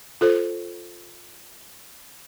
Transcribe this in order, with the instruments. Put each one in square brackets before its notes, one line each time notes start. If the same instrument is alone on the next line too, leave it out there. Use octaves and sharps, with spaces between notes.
[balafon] F4 A4 C5